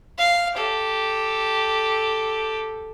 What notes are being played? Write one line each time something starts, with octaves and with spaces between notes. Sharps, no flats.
F5
G4 A4